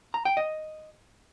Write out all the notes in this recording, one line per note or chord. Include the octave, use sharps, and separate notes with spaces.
A#5
G5
D#5